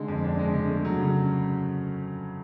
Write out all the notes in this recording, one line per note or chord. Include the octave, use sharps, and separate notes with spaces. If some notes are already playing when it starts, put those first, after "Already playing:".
Already playing: D3 G#3
F2
D4
G#3
D3
A3
F#3
C#3